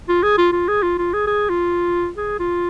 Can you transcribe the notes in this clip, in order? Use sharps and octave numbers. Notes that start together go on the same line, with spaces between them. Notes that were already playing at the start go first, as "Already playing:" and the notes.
F4
G#4
F4
F4
G#4
F4
F4
G#4
G#4
F4
G#4
F4